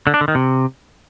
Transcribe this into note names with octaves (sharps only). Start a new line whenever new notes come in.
D3
D4
D3
D#3
C3